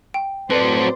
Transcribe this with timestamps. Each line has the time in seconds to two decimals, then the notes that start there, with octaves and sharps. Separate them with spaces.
0.14 G5
0.50 A2 F#3 C4 A4 B4 C5 D5